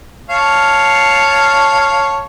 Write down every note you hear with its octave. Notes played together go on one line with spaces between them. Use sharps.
C#5 F5 A5